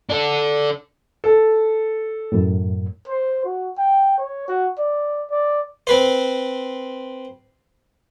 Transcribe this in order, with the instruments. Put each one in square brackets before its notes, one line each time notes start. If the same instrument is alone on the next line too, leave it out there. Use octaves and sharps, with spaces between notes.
[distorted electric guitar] D4 A4
[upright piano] A4
[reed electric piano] F#2 A2
[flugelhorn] C5
F#4
G5
C#5
F#4
D5
D5
[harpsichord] C4 B4 C5